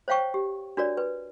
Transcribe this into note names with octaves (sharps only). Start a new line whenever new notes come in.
C5 C#5 F5 G5 C#6
G4
D4 F#4 A#4 C#5 D5
B4